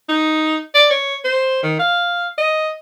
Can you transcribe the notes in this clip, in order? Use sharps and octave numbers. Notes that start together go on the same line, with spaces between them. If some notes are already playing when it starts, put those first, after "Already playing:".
D#4
D5
C#5
C5
D#3
F5
D#5